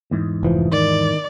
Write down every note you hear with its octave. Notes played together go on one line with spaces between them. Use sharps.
E2 G#2
F1 E3 F3
D#3 D5